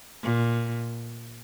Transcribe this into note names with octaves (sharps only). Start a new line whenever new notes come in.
A#2